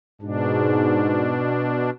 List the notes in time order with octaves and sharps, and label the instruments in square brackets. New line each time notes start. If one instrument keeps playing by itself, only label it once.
[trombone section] G#2 [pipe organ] B2 D4